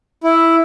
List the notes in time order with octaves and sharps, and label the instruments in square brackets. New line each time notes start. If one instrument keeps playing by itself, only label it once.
[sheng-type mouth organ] E4